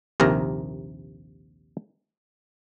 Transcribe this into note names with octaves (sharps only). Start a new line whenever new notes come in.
A#1 D#2 C3 A#4 A#5